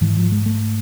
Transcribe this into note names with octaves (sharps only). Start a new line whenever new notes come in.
G#2 E3
F3
G#3
A3